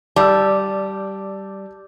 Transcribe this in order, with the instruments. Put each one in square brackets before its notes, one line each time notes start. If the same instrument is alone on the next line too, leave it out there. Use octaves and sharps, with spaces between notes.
[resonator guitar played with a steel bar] G3 [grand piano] D5 E6 [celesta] A5 D6